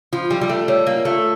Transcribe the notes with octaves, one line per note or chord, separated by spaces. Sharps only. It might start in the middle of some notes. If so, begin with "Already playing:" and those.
F3 F4
G3
G3 F4
A3
G3 C#5
A#3
F4
A3